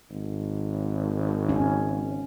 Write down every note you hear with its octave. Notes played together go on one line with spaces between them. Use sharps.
G#1
C#4